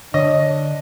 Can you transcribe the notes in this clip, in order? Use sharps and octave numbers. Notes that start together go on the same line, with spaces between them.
D3 D4 C#5 D#5